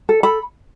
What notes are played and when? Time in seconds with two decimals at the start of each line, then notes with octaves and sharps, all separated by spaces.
0.09 A4
0.23 A4 B5